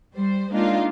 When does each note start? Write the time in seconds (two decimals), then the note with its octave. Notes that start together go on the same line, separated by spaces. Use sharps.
0.15 G3 C5
0.52 G#3 A#3 D4 D#4 F4